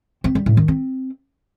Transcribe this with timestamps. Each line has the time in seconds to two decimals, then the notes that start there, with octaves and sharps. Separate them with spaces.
0.24 C4
0.35 G3
0.46 A2
0.57 D#3
0.68 C4